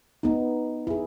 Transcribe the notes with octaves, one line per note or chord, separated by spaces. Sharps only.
B3 D#4
E4 G#4